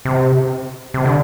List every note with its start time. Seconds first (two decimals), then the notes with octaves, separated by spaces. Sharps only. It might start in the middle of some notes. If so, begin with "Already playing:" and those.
0.05 C3
0.94 C3
1.05 D3